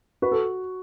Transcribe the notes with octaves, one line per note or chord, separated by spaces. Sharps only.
F#4 B4
A4